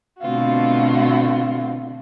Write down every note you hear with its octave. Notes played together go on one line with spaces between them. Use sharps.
B2 D3 A3 C4 F4 F#4